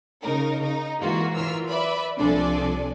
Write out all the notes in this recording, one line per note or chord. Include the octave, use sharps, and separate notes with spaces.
C#3 D#4 A#4
D#4
E3 G#3 A#3 F4 F#4
E3 F#3 F4 A#4 E6 F6
B4 D5 E5 B5
C2 F3 D4 A4 D5 G#5